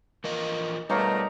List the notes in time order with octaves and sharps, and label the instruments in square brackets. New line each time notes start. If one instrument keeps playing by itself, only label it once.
[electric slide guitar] E3 F3 D#5 [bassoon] A#3
[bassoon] B2 [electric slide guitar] G3 [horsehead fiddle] A3 A#4 [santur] D#4 C#5 F5